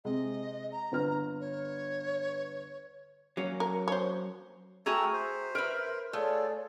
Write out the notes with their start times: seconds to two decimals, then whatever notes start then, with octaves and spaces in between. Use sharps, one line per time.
0.05 C3 G#3 D#5
0.72 A#5
0.92 G1 B4 F6
1.41 C#5
3.37 F#3 A#3 C#4
3.60 A#4
3.88 C5 C#5
4.86 A3 F#4 G#4 G5 A#5 E6 F6
5.13 C5 E5
5.55 A#4 B4
6.13 A3 F4 G#4 A4 C#5 D5